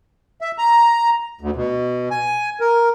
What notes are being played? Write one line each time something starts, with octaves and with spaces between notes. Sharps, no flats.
E5
A#5
D2
B2
G#5
A#4